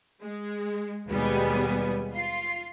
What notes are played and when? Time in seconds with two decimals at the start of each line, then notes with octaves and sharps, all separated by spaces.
0.21 G#3
1.08 D#2 B2 G3 G#3 B3 G#5
2.13 F4 C7